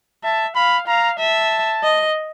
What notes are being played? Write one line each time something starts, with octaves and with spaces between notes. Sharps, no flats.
E5 A5
F5 B5
F5 A#5
E5 A5
D#5